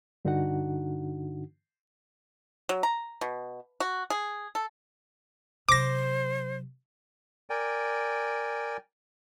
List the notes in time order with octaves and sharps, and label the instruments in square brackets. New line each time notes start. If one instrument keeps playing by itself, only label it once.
[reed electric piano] G2 D3 D4 D#4 F#4 F#5
[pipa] F#3
A#5
B2
F#4
G#4
A4
[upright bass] C3 F#3 [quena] C5 [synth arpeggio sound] D6 A#6
[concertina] A#4 D5 G5 G#5